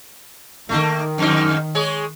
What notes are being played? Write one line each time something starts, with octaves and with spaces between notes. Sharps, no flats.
D#3 A3 A#3
F2 G#2 D#4
G#3 G#4 C#5